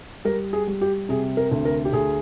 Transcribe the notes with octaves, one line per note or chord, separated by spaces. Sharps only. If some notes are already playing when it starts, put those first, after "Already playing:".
G3 A#4
G#4
G3
G4
C3 G#4
A#4
D2
A#4
G4
D2 G#4